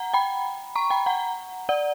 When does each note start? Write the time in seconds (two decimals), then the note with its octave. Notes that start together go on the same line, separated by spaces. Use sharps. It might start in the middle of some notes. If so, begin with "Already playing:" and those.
Already playing: F#5 A#5
0.14 G5 B5
0.76 A#5 C#6
0.90 G5 B5
1.06 F#5 A#5
1.69 D5 F#5